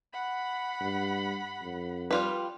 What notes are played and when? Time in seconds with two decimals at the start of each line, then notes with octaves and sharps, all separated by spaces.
0.13 F#5 B5
0.81 G2
1.62 F2
2.11 G3 F4 B4